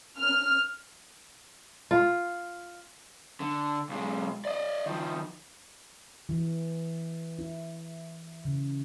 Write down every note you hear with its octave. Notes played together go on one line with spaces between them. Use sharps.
F6
F4
D3
B1 G#3
D5 D#5
D#3 F3
E3
E4
C#3